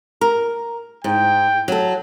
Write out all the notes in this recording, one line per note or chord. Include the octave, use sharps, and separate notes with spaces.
A#4
G#2 G5
F#3 A4